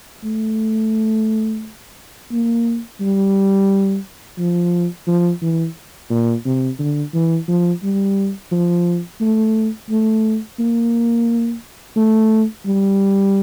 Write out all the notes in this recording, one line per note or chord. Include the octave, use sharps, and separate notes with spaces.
A3
A#3
G3
F3
F3
E3
A#2
C3
D3
E3
F3
G3
F3
A3
A3
A#3
A3
G3